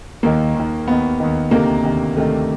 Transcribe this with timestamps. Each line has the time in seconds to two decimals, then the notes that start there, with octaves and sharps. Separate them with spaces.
0.23 D#2 D#3 A#3
0.55 D#2 D#3
0.87 D#2 D#3 B3
1.20 D#2 D#3
1.51 D2 C3 D#3 A#3
1.83 D2 C3 D#3
2.16 D2 C3 D#3 A3